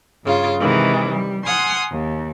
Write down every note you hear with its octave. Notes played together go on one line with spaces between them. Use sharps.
G2 C#3 F4
C3 D#3 E3 G#3
G3
F#5 G#5 C6 D#6 F6
D#2